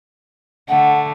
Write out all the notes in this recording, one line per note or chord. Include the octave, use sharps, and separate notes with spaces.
D3 A3 F#5